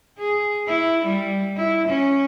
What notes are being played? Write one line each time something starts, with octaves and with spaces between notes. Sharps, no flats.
G#4
E4
G3
E4
C#4